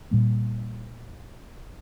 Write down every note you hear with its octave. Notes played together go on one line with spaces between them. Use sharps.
A#2 G3 A#3